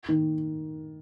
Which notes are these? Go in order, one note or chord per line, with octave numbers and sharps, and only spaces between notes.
D#3